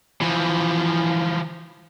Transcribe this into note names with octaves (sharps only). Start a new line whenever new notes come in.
E3 F3